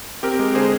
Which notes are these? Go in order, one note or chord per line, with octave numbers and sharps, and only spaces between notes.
C4 G4 A#4
G#3
D3 G#4 C5